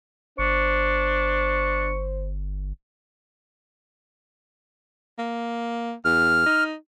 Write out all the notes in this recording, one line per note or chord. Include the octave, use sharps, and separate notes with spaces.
G1 D4 C5 C#6
A#3
E2 F6
D#4